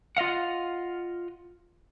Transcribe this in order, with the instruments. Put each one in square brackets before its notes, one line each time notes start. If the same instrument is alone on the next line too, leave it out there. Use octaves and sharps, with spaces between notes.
[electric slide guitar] F4 D#5 F5 F#5